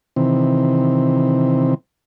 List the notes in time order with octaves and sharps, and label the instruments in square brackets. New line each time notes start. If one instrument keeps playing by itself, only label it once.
[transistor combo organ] C3 D#3 E3 C4